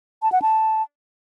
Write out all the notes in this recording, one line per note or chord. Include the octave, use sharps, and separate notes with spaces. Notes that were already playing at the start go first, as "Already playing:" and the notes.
A5
F#5
A5